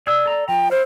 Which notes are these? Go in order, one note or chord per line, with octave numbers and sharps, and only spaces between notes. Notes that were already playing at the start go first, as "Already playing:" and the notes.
G#4 D5 E6
A4 A#5
F3 G5 A#5
E4 C5 F5